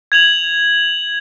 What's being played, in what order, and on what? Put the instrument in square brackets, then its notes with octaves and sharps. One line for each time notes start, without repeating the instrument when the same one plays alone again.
[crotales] G#6 F7 F#7